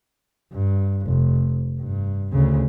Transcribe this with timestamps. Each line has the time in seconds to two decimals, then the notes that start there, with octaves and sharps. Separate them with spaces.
0.53 G2
1.06 F1
1.79 G2
2.32 D2 C#3